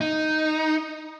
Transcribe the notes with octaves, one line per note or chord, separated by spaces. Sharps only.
D#4